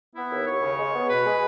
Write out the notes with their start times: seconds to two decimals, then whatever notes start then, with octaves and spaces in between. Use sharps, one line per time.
0.15 B3 E4
0.31 D#2
0.46 D#2 C#5
0.62 C#3
0.78 G#3
0.94 B3
1.09 B2 B4
1.25 G#3